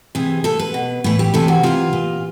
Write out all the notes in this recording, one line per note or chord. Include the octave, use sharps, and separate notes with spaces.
C3 E3 G#4
A#2 A4
B4
B2
A2 E3 B4
G4
C3 E3 A4
F#4
C3 E3 F4
A#2